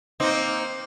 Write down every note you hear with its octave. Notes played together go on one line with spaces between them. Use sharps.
A#3 C4 D#4